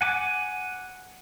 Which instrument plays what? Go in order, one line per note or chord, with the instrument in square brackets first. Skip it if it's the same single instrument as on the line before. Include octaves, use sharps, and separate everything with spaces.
[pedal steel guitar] F#5 G#5 D6